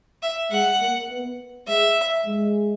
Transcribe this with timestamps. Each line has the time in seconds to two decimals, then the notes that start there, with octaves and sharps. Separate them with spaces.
0.22 E5
0.51 G#3 F#5
0.80 A#3
1.10 B3
1.68 G#3 E5
2.26 G#3